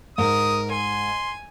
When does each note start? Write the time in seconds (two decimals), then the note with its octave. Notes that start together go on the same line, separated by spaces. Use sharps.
0.18 G#2 A#4 D#6
0.72 G#5 C6